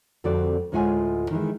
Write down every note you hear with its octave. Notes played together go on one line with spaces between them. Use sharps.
F2 D3 G3 C4 F#4 D5
D2 A2 G#3 F4 F#5 G#5
D#3 E3 G#3